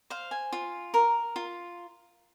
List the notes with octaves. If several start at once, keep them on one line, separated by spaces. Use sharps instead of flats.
C5 F5
G#5
F4
A#4
F4